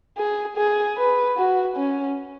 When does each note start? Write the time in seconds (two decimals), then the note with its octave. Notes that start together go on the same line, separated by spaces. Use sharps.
0.18 G#4
0.57 G#4
0.97 B4
1.37 F#4
1.76 C#4